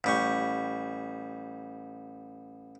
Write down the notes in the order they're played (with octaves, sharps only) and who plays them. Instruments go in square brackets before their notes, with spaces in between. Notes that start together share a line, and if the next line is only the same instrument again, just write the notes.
[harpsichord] A1 G3 C#6